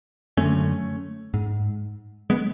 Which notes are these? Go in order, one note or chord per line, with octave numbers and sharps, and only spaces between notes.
F#2 D3 A3 C#4
G#2
G#3 B3